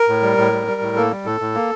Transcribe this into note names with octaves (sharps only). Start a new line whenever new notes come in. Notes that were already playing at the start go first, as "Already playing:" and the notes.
Already playing: A#4
A2
G3
A2
G3
G3
A2
A#3 A4
G3
A2 A4
A2
A#3